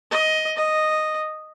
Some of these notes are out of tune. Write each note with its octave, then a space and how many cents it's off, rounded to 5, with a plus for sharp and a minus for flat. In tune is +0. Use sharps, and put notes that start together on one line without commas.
D#5 +10
D#5 -5